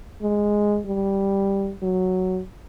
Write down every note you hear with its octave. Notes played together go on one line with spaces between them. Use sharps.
G#3
G3
F#3